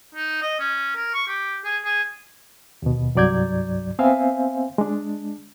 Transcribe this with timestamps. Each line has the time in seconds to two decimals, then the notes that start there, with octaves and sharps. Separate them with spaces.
0.15 D#4
0.42 D#5
0.60 C#4
0.96 A#4
1.14 C#6
1.28 G4
1.64 G#4
1.84 G#4
2.82 D#2 B2
3.15 C2 G2 F#3 D5 G6 G#6
3.99 B3 C4 C5 E5 F5 G#5
4.78 G#3 D4